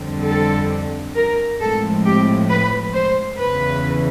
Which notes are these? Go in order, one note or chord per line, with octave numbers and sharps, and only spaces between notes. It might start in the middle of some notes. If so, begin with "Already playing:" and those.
Already playing: F2 D3 G3 C4
A4
A#4
A2 F3 G#3 C4 A4
G4
B4
C5
E2 C#3 E3 B4